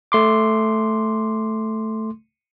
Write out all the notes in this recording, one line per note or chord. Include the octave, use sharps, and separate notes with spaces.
A3 C6 D6